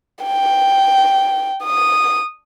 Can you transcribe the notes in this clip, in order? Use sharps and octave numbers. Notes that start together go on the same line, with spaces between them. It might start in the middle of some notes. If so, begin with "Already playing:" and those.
G5
D#6